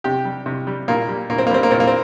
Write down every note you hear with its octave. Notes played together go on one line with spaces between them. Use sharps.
C3 G4
G3
C3
G3
A#2 A#3
G3
A#2 A#3
C4
A#3
G3 C4
A#3
A#2 C4
A#3
C4